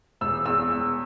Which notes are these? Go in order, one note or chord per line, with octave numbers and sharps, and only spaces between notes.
E1 E6
E2 E6
E1